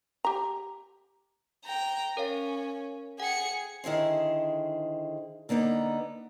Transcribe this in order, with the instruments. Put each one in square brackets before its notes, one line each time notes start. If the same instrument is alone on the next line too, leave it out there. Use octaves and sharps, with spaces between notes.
[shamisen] G4 A#5
[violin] G5 A#5
[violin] C#4 [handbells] A#4 C#5 F5
[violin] G#4 C#7 [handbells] F#5 G5
[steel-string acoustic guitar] D3 D#3 E4 G#4 C5
D3 A#3 B3 D#4